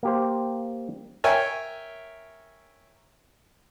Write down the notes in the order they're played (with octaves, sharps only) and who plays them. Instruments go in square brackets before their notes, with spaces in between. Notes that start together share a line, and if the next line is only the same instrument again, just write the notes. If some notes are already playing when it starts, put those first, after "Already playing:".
[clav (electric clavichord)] A#3 G4 C5
[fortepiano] A#4 C#5 E5 G5 G#5